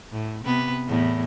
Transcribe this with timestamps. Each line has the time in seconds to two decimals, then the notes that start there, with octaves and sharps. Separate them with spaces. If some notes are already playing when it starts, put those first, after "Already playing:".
0.12 A2
0.44 C3 B3 B4
0.87 E2 A2